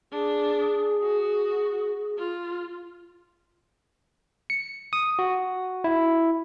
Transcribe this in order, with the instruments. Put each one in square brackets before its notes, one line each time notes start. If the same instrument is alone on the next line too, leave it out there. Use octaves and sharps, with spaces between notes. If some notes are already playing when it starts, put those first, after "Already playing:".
[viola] D4 [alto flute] G#4
[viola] F#4
F4
[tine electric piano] C#7
D#6
F#4
E4